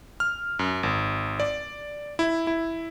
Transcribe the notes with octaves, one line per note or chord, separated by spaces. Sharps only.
F6
F#2
G#1
D5
E4
E4